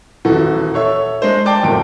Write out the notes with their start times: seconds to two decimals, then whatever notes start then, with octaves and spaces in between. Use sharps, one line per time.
0.25 D#1 E3 F#4 A4
0.74 A4 C#5 E5
1.22 G#3 D4 C5
1.46 D5 G5 A5 D6
1.63 D1 E2 A3 A#4 D7